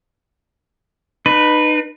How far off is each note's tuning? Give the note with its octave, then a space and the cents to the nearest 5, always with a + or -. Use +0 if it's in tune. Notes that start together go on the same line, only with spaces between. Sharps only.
D#4 -35 B4 +0